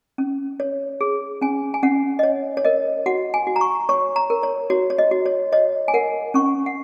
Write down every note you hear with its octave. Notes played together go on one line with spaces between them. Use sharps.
C#4
C#5
G#4
C#4 G#5
G#5
C#4 F#5
D#5
C#5
C#5
A#4 D#5
F#4 F#5
G#5
F#4
A#5
C#6
C#5 C#6
A#5
A#4
C#5
F#4 C#5
C#5
D#5
F#4
C#5
C#5 D#5
G#5
A#4 F#5
C#4 C#6
F#5